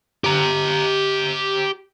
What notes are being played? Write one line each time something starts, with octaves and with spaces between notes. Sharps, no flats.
G4 A#5